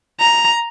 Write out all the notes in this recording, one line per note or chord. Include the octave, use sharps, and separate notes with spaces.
A#5